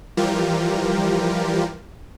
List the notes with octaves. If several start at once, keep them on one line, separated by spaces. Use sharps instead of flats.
E3 F3 G3 F4 G4 A#4